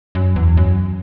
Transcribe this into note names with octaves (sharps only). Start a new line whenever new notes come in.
F#2
E2
F#2